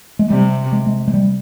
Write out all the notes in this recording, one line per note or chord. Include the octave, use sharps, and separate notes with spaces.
G#3
C3 G3
G#3
G#3
G#3
G3